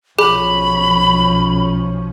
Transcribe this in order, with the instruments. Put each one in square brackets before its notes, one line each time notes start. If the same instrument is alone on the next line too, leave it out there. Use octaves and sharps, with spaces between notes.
[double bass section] B1 F3 C#4 [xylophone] G#4 [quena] B5